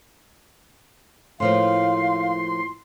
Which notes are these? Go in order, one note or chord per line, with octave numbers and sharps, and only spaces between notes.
A2 F3 A#3 F5 C6